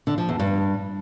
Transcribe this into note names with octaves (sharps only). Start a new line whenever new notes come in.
D3
F3
E2
G2